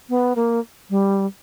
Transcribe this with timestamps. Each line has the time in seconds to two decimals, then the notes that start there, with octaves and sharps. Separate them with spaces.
0.09 B3
0.36 A#3
0.90 G3